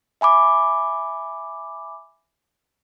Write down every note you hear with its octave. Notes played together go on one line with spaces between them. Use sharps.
E5 G#5 B5 D6